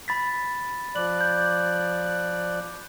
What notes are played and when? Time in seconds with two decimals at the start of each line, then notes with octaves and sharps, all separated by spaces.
0.08 B5 A6 B6
0.96 F3 D5 F#6 F#7
1.21 G6